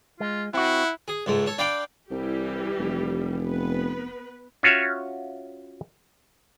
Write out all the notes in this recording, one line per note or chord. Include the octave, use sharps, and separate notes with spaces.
G#3 F4
C4 E4 F#4 F#5
G#4
C#2 G#2 A3
A4 C#5
D4 D5 F5 G5 B5
C2 E3 G3 G4
F1
B3 B4
C#4 F4 F#4 C#5 E5